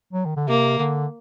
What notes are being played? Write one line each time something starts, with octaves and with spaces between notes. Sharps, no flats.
F#3
D#3
D3
C3 A#3
D3